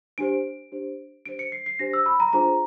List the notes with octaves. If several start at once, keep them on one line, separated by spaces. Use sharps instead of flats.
D4 G4 C5 D7
D4 G4 C5
D4 G4 C5 D7
C#7
C7
C7
D4 G4 C5 A#6
E6
B5
A#5
D4 F4 G#4 C5 A#5